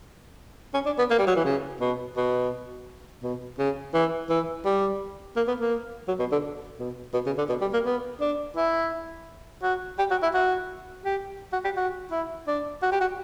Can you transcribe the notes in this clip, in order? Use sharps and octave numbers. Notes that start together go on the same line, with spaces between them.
C#4
D4
B3
A#3
G3
F#3
E3
C#3
B2
B2
B2
C#3
E3
E3
G3
A#3
B3
A#3
F#3
B2
D3
B2
B2
C#3
D3
B2
G3
A#3
B3
D4
E4
F#4
G4
F#4
E4
F#4
G4
F#4
G4
F#4
E4
D4
F#4
G4
F#4